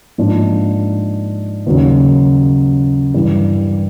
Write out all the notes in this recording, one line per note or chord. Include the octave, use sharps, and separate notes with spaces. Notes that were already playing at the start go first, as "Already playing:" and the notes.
G#2 F3 A#3 D4 F4
D#2 C#3 F#3
G2 E3 G3